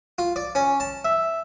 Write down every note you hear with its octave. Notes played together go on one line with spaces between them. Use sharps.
F4
D5
C#4
A5
E5